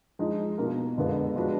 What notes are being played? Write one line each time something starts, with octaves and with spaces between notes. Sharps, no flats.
F3 G#3 D#4
B2 A#3 F4 A#4
F2 D3 G#3 B3 F4
F3 G#3 D4 F#4 B4